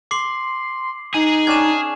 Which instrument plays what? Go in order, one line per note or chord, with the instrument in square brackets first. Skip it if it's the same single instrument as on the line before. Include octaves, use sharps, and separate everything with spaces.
[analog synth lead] C6 [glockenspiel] D6 C7 F#7
[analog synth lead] D#4 [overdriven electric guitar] G#4
[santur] C#4 D4 G5 [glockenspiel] G#6 E7